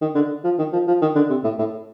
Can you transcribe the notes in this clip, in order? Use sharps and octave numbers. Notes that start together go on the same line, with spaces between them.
D#3
D3
F3
D#3
F3
F3
D#3
D3
C3
A2
A2